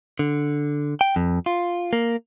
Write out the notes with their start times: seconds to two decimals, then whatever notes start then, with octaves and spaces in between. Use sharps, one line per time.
0.19 D3
1.01 G5
1.16 F2
1.46 F4
1.93 A#3